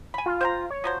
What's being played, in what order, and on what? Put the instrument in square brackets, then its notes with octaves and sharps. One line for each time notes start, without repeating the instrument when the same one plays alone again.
[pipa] G#5 B5
[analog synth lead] F4
[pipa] C5 G5 A#5
[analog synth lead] C#5
[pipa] F3 F#3 C5